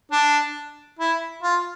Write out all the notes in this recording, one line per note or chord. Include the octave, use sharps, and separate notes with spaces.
D4
E4
F4